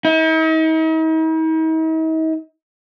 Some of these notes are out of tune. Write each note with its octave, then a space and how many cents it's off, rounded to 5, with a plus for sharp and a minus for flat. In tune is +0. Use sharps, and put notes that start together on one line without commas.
D#4 +45